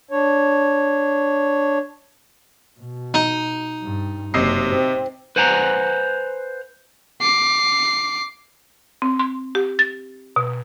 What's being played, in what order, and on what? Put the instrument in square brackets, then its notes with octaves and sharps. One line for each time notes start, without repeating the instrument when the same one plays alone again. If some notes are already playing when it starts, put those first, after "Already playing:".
[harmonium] D4 C#5
[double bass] B2
[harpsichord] D#4
[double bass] G2
[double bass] F#1 [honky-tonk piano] C3 D#5 C7
[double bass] C4
[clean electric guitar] B4 C5 F#5 G#5 A#5
[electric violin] D6 C7
[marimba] C4
C6
G4
A6
B2